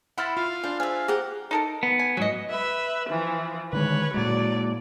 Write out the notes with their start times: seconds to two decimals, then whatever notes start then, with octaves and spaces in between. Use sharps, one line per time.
0.18 E4 C5 F#5 B5 F6 A6
0.37 F4 F5
0.64 D4 F4 C5 G#5
0.80 G#4 C5 E5 F5
1.08 G4 G#4 C5 F#5 A#5
1.51 D#4 A4 A#4
1.83 B3
1.99 G#5
2.17 G#2 F#3 C#4 D#5
2.50 B4 E5
3.09 E3 F3
3.73 D3 D#3 G#3 B4 C#5
4.14 A#2 F#3 G#3 D5